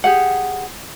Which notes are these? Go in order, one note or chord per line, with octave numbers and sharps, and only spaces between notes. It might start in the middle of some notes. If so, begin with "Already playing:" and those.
G4 G#4 F#5